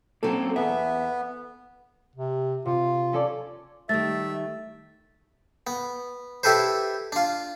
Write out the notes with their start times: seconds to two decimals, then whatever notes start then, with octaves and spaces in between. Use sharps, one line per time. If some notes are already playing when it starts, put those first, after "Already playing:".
0.23 F#3 A#3 C4 C#4 A4
0.56 E2 B3 E5
2.15 C3
2.66 C3 F4
3.13 C#4 A4 D5
3.89 D#3 G3 A3 E5 A6
5.67 B3
6.43 E4 G4 A4 B4 C5
7.12 D4 F4